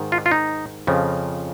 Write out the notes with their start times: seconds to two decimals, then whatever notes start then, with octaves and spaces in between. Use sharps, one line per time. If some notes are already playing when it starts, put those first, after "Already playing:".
Already playing: G#2 D#3
0.12 F4
0.26 F4
0.31 D#4
0.87 F2 C#3 F3